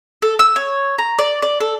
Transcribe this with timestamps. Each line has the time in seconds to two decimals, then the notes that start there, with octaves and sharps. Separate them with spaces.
0.22 A4
0.39 E6
0.56 C#5
0.98 A#5
1.19 D5
1.42 D5
1.60 A4